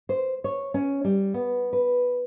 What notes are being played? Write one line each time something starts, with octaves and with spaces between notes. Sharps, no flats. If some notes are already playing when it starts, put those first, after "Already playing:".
C5
C#5
C#4
G3
B3
B4